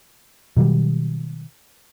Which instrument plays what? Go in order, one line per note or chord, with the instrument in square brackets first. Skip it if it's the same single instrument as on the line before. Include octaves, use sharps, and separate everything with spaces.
[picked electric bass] B2 D#3 F#3 G3